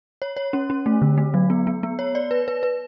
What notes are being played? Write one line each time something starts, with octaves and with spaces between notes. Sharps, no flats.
C#5
C#5
C#4
C#4
A3
D3
A3
F#3
B3
B3
B3
C#5
D5
B4
B4
B4